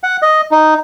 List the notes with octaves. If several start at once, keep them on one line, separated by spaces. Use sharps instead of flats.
F#5
D#5
D#4